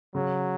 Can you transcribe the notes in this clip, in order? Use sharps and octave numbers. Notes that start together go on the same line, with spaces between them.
C#3 F#3